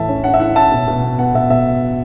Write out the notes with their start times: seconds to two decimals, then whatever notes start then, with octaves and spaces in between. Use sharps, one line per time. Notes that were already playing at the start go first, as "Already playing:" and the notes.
Already playing: A2 E3 E5 A5
0.09 C#4
0.24 C#4 F#5
0.34 E5
0.40 E4 F#5
0.56 C#4 E5 A5
0.72 B2
0.88 B2
1.03 B3
1.18 B3 F#5
1.35 B2 E5
1.50 B2 E5